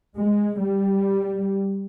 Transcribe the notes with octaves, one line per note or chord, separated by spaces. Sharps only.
G#3
G3